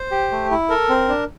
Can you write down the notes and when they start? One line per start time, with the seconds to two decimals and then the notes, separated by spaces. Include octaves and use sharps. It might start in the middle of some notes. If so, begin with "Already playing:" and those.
Already playing: C5
0.11 G4
0.31 A3
0.51 E4
0.70 A4 A#4
0.89 C4
1.09 D4